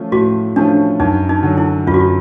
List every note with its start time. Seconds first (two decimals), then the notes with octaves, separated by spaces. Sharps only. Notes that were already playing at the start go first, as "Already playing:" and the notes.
Already playing: F3 A3 C#4 F4
0.12 A2 F#4
0.56 F3 A3 C#4 D4 F4
1.00 F#2 D#4
1.29 D#4
1.43 D3 F#3
1.58 E4
1.87 F#2 F4
1.94 F#4
2.00 F4